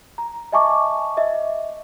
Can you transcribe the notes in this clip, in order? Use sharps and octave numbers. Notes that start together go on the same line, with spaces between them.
A#5
D#5 E5 G#5 A5 C#6 D6
D#5 E5